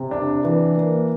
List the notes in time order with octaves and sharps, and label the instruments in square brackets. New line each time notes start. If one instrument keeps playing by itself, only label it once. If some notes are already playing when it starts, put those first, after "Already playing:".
Already playing: [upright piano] C3
D4
E3
A#3